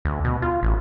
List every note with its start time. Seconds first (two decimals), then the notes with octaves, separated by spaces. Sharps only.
0.05 D2
0.25 B2
0.42 F4
0.63 A1